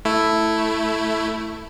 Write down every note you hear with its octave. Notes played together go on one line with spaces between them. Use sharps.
A3 E4